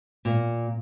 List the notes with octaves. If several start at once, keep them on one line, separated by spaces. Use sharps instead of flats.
A#2